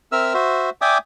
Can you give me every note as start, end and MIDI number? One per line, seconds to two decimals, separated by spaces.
0.12 0.33 60
0.12 0.33 70
0.12 0.33 76
0.12 0.33 88
0.12 0.33 89
0.34 0.70 66
0.34 0.70 72
0.34 0.70 76
0.81 0.98 74
0.81 0.98 76
0.81 0.98 79
0.81 0.98 80
0.81 0.98 86
0.81 0.98 87